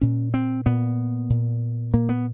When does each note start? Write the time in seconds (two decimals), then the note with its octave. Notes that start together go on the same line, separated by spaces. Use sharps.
0.01 A#2 C#4
0.34 C4
0.66 A#2 B3
1.30 A#2
1.93 A#2 A#3
2.09 B3